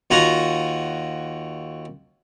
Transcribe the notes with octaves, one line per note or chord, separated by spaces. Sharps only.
D#2 F4 F#4 G#5 A#5